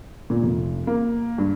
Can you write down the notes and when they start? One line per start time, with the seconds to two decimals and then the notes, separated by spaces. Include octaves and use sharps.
0.30 A#2
0.43 F1
0.87 A#3
1.38 G2